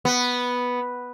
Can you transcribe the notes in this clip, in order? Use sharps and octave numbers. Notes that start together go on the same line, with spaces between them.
B3